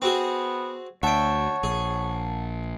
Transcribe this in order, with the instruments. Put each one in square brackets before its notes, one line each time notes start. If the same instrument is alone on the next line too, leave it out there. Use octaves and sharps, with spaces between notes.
[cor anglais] B3 [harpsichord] C4 F#4 G#4
[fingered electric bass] D2 [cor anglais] C#5 [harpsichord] E5 G5 [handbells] F#5 A5
[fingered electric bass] A#1 [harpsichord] G#4